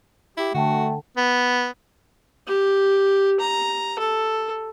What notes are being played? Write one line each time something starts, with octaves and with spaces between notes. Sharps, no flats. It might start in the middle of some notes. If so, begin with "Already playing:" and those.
E4 G4
D3 A3 F#4 F#5 G5 A5
B3
G4
A#5
A4